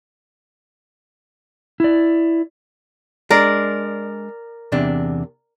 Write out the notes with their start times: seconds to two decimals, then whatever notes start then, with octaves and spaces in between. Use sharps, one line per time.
1.80 E4 D5
3.30 G#3 D4 A#4 D5
4.72 E2 C3 D4